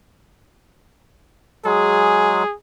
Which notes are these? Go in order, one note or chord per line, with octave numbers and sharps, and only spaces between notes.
F#3 G#3 G#4